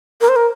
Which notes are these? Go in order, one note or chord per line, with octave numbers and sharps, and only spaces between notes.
A#4
C5
A#4